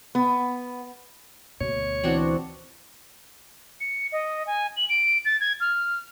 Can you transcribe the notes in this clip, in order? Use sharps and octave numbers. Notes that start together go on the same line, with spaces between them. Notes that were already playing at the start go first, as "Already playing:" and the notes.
B3
D2 B2 C#5
E3 C4 D4 F#4
C#7
D#5
G#5
F#7
D7
A6
G#6
F6